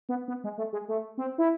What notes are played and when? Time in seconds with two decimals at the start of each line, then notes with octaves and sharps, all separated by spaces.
0.09 B3
0.28 B3
0.44 G#3
0.58 A3
0.73 G#3
0.88 A3
1.18 C4
1.38 E4